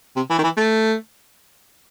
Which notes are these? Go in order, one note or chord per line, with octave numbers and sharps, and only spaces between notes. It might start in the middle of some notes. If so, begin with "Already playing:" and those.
C3
E3
D#3
E3
A3